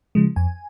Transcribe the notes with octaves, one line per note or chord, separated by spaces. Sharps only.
C#3 F3 G#3
F2 G#5